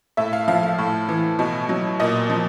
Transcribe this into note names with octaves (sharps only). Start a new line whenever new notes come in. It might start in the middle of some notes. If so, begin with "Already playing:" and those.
A2 E5
F5
F3 F5
F5
A2
E3
B2
F#3
A#2 D#5
F3